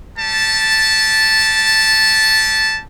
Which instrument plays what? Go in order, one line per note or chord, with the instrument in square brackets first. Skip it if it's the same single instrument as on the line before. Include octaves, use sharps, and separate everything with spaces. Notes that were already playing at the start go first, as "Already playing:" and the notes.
[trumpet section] G3 A5